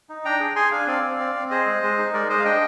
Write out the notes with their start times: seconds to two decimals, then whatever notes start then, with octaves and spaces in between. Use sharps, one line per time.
0.09 D#4
0.25 D4 G5 A#5
0.40 G#4
0.56 G#4 G#5 C6
0.71 D4 F5 G#5
0.87 C4 D5 F5
1.03 C4
1.20 C4
1.35 C4
1.50 G#4 C5 D#5
1.66 G#3
1.83 G#3
1.98 D#4
2.13 G#3 A#4 D5
2.29 G#3 C5 D#5
2.39 F5
2.45 D4 D#5 G5